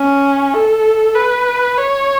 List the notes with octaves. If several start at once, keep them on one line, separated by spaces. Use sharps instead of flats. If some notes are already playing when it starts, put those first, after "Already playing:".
Already playing: C#4
A4
B4
C#5